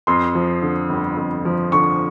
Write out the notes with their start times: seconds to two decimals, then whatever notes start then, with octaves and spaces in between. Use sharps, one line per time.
0.07 F2 C6
0.35 F3
0.62 D3
0.89 G1
1.17 F2
1.45 F3
1.72 D3 C#6